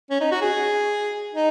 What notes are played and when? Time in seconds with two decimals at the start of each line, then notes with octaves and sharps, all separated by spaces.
0.10 C#4
0.21 D#4
0.31 F#4
0.41 G#4
1.33 D#4